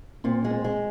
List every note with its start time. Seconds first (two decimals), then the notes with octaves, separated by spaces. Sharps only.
0.24 A#2 C4
0.44 G#3
0.51 C4
0.64 G#3